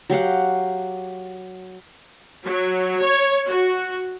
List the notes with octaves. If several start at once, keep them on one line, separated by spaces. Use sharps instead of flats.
F#3 G4 F5 F#5
F#3
C#5
F#4